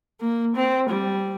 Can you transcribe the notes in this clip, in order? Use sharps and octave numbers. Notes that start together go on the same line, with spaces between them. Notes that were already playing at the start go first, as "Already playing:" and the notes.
A#3
C4
G3